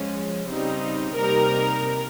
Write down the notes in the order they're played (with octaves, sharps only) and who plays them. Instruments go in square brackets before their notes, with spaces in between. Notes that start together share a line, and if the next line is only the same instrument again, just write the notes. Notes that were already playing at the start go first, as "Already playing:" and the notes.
Already playing: [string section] F3 G#3 C#4
C#3 G3 C4 D#4
C3 G3 A#3 D#4 A#4